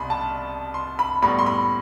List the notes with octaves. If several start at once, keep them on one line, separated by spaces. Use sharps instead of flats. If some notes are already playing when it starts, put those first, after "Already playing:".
Already playing: C2 B2 G3 B5 C6
A5
C6
B5
A2 G3 B3 B5
C6
B5